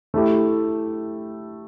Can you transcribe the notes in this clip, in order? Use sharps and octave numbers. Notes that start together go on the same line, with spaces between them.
A3 E4 G4